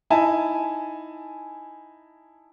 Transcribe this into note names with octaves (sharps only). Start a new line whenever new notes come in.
D#4 E4 G#5 A5